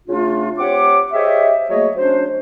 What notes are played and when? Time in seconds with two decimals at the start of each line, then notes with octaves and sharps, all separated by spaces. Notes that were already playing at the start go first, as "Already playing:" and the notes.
0.08 C#3 A3 D4 F4
0.58 C4 G4 C#5 F#5 D6
1.12 G4 G#4 C5 C#5 D#5 E5
1.69 F#3 A3 A#3 G#4 C#5 D#5
1.96 F#3 C#4 D4 C5